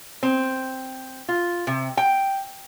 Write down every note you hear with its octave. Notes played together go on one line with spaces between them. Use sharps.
C4
F4
C3
G5